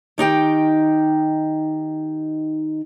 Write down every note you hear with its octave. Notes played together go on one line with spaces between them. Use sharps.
D#3 D#4 G4 G5